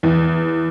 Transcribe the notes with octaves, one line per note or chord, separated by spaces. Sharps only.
E2